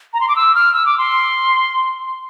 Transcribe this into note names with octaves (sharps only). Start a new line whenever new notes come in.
A#5
C6
D6
E6
F6
E6
D6
C6